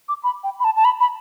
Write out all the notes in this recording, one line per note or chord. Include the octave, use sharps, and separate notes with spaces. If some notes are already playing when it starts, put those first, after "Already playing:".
D6
B5
G5
B5
A5
A5
B5
B5